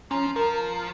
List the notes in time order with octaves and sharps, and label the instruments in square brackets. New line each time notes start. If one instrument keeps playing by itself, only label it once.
[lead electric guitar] F3 [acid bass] C#4 [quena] A#5
[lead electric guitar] F3 [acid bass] A#4